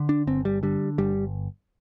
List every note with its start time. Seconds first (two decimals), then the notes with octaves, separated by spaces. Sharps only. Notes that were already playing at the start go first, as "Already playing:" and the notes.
Already playing: D3
0.09 D4
0.27 G1 C4
0.45 G3
0.63 D3 G3
0.98 G1 G3